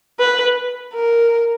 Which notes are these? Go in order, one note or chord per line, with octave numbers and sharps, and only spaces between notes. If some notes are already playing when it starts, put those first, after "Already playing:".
B4
A#4